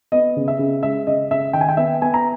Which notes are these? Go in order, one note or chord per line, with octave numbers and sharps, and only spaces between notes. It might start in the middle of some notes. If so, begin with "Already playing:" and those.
B3 D#5
C#3
E5
C#3
G#3 E5
C#3 D#5
C#3 E5
D#3 G5
G#5
G5
B3 E5
B3 G#5
A#5